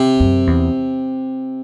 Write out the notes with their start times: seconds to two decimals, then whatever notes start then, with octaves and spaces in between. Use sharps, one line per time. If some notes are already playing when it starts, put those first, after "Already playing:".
Already playing: C3
0.20 F#2
0.47 E2